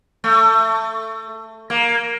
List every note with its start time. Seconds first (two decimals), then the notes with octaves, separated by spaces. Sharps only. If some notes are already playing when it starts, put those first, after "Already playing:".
0.24 A3
1.70 A#3